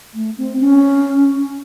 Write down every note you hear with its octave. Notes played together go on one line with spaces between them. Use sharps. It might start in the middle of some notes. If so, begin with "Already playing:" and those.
A3
C4
C#4